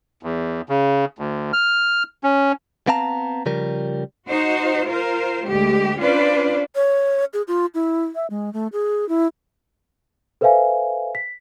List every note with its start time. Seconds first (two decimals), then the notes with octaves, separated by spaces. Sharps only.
0.23 E2
0.69 C#3
1.19 D2
1.53 F6
2.24 C#4
2.87 B3 C4 F5 A5 A#5
3.46 C#3 F3 G3 A#4
4.28 D#4 F#4 C5
4.87 F4 A#4 C5
5.48 D2 G#3 G4
6.00 C#4 D4 F4 B4 C5 D5
6.75 C#5
7.33 G#4
7.48 F4
7.74 E4
8.15 E5
8.30 G#3
8.53 A3
8.73 G#4
9.09 E4
10.41 A4 B4 C5 E5 F5 G#5
11.15 B6